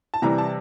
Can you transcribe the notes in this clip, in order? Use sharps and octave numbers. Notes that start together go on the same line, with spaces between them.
A5
C3 E3 G3 A#5
A5